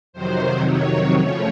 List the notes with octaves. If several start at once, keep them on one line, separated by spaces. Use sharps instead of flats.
F2 C3 D#3 F#3 C5
C#5
F#2 C#3 F3 A3 C#5